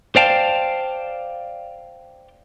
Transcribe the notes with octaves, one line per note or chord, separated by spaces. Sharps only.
C5 D5 F5 G5 A5